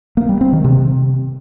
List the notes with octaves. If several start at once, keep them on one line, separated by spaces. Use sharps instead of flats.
A#3
G3
C4
D#3
C3